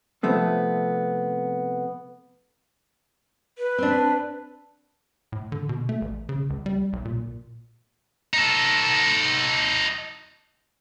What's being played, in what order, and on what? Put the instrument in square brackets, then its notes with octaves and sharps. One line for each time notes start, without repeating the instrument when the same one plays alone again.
[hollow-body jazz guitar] C3 F3 A3 B3 C4
[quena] B4
[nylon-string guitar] C4 D4
[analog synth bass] A2
D3
B2
A3
A1
C#3
C#2
G3
B1
A#2
[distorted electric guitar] D#4 A4